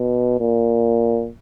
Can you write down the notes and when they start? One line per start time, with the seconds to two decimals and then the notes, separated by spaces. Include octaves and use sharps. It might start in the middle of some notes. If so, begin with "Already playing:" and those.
Already playing: B2
0.39 A#2